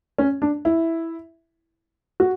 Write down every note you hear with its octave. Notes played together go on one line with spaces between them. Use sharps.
C#4
D4
E4
F#4